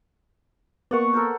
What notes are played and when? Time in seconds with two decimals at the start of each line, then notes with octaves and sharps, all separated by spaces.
0.91 A#3 B3 D5 F#5 C#6
1.13 A4 A#4 C5